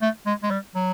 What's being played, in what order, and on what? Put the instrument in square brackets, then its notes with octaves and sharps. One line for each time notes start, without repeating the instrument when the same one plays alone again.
[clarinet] A3
G#3
G#3
G3
F#3